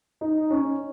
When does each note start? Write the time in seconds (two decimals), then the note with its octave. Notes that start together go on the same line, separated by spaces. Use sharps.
0.21 D#4
0.50 C#4